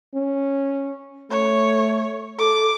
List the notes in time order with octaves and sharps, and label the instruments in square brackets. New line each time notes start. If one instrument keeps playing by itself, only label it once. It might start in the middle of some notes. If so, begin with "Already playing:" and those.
[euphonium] C#4
[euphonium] A3 [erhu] C#5
[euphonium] A4 [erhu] D6